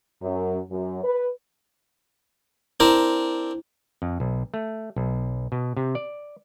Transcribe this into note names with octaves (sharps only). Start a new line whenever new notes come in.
F#2
F#2
B4
C4 D4 E4 A#4
F2
B1
A3
B1
B2
C3
D5